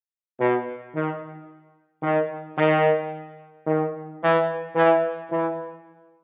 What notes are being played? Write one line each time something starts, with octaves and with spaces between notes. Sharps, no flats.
B2
D#3
D#3
D#3
D#3
E3
E3
E3